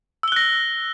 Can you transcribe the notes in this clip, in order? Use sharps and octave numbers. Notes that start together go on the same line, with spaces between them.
E6 F#6 A#6 G7